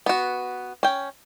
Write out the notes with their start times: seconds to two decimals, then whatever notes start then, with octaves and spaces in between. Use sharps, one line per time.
0.06 B3 F#4
0.83 C#4 G5